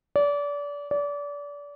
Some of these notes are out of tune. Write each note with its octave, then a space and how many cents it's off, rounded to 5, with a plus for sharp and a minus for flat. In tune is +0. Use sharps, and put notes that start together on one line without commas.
D5 -30
D5 -30